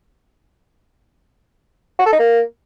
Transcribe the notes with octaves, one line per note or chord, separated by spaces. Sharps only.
F#4
A4
D#4
A#3